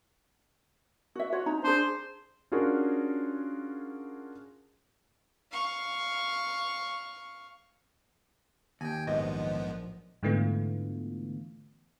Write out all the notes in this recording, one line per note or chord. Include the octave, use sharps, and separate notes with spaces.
F#4 E5
F4 F#4 C#5
D#4 A#5
D4 G#4 C5
C#4 D4 F4 F#4 G#4 A#4
F5 C#6
D#2 G5 G#5
A#1 G#2 F3 F#3 B3 D#5
G#2 D3 E3 A3 B3 F4